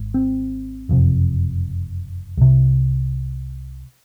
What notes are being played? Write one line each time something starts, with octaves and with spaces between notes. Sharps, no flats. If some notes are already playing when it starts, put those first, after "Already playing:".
Already playing: G#1 G#2
C4
F#1 F2 C3
C2 C3